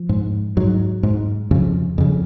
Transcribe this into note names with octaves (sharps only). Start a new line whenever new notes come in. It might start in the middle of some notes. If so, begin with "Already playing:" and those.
Already playing: F3
G#2
G#2 F#3
G#2
F2 C#3
F2 C#3